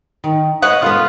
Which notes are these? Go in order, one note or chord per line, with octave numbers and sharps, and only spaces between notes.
D#3
B4 C#5 D#5 F#5
C#3 A3 B3 F4